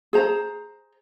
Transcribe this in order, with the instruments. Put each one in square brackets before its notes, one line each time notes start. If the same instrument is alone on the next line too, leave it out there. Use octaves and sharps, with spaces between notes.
[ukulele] G#4 C5 A#5